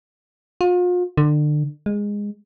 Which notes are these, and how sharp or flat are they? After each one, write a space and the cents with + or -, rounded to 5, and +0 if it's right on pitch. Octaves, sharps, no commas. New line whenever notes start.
F4 +40
D3 +30
G#3 -15